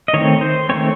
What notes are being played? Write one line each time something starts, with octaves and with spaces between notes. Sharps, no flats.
D#5
D#3 A3 C4 C#5
C5
D#3 A3 C4 C#5